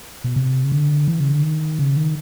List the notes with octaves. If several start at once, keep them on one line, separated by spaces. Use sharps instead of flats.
B2
C3
C#3
D3
E3
C#3
D3
D#3
C#3
D#3